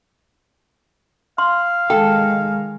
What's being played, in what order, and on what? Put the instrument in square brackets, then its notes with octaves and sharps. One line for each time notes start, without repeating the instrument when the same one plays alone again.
[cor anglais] F5 [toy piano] C6
[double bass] D#3 G#3 [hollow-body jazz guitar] A4 [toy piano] G5